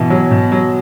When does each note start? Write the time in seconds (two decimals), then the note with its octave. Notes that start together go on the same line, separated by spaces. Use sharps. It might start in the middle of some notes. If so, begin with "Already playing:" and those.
Already playing: B2 E3
0.10 F#3
0.31 B2
0.52 F#3